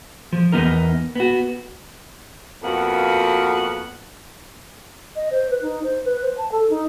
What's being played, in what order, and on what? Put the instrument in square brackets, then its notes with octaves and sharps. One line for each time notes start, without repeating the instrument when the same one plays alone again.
[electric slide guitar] F3
E2 E3 B3 D#4 A#4
B3 F#4
[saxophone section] F2 A#3 B3 F#4 F#5
[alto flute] D#5
C5
B4
D#4
C5
B4
C5
A5
A4
D#4